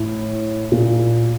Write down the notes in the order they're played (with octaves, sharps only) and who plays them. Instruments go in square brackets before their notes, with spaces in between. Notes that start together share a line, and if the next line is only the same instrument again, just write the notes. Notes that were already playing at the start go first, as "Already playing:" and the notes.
Already playing: [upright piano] A2
A#2